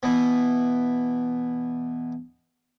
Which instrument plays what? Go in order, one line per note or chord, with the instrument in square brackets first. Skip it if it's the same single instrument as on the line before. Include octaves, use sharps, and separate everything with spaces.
[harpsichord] B2 E3